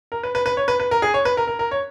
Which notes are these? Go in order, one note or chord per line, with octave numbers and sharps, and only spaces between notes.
A#4
B4
B4
B4
C#5
B4
B4
A#4
G#4
C#5
B4
A#4
A#4
A#4
C#5